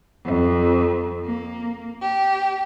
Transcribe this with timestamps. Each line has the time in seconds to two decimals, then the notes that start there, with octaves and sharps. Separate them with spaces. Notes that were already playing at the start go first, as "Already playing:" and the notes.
0.24 F2
1.25 A#3
2.01 G4